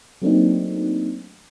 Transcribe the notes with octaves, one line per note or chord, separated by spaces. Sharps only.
F#3 A3 A#3 C4 D4 D#4